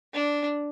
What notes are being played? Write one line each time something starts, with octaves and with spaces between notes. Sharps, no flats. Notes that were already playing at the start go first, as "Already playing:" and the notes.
D4